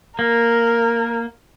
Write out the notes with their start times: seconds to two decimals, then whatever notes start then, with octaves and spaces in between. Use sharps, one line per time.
0.19 A#3 A#4